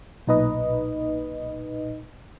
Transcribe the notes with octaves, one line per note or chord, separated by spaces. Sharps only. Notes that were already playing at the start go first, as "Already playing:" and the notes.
B1 A#2 D#4 B4 D#5